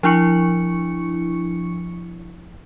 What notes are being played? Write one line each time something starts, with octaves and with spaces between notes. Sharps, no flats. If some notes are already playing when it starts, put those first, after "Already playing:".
F3 D4 E4 C#6 C#7